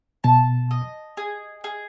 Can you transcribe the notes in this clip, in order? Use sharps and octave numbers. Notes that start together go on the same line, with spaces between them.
B2 A5
D#5
G#4
G#4